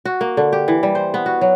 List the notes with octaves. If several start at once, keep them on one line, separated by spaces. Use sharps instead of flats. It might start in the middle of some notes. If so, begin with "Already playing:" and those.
F#4
A#3
D3
G4
E3
G3
C5
B3
F#4
F#3